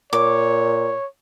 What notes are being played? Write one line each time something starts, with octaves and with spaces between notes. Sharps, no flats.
A#2 C#5 D6